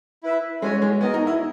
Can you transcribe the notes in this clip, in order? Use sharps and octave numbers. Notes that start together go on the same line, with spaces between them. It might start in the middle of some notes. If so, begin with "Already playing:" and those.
E4 B4 E5
G#3 C#4 F#4 C#5 G#5
G#3
B3 F#4 A#4 D#5 G#5
D#4
E4